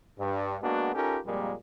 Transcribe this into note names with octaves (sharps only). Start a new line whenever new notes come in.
G2
G#3 A#3 B3 D4 F#4
C#4 D#4 F4 G4 A4 A#4
F2 A#2 G3 G#3 A#3